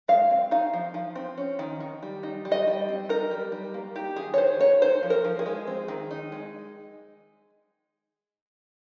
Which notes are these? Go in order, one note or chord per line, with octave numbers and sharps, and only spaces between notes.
G#3 F5
C4
D#4 F5
F3
F3
C4
C#4
D#3
D#3
G3
D#4
G3
D#5
G3
C4
D#4 A#4
G3
G3
A#3
D#4 G4
D#3 G#4
C#5
D#3 C5
A#3 C#5
D#4 C5
F3
A#4
F3
G#4
G#3
C4
D#3
D#4
G#3